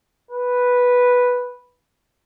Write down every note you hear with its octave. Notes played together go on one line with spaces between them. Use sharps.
B4